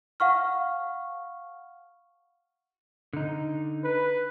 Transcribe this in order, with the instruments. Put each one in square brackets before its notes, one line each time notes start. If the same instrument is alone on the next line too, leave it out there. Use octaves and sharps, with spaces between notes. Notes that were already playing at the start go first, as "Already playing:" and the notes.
[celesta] F5 F#5 C#6 F6
[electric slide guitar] D3 D#4
[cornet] B4